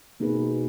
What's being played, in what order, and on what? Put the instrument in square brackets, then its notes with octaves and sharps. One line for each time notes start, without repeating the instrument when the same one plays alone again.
[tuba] B2 [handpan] A#3 D#4 G#4 B4